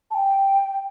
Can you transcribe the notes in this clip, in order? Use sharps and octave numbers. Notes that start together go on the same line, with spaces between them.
A5
G5